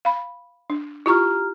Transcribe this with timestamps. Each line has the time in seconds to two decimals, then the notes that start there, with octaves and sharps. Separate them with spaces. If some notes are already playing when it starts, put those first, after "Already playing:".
0.05 F5 B5
0.70 D4
1.06 E4 F4 G4 A#5 C#6 F6